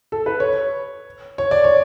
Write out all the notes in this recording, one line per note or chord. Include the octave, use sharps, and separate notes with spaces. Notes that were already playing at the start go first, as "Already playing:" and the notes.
A4
B4
C#5
C#5
D5
C#5